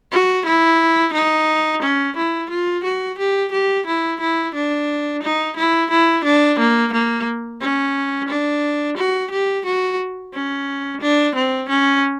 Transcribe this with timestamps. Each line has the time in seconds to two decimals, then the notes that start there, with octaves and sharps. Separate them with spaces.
0.12 F#4
0.46 E4
1.14 D#4
1.82 C#4
2.16 E4
2.50 F4
2.84 F#4
3.19 G4
3.52 G4
3.87 E4
4.20 E4
4.55 D4
5.23 D#4
5.57 E4
5.91 E4
6.24 D4
6.59 A#3
6.93 A#3
7.61 C#4
8.29 D4
8.97 F#4
9.31 G4
9.66 F#4
10.34 C#4
11.01 D4
11.35 C4
11.69 C#4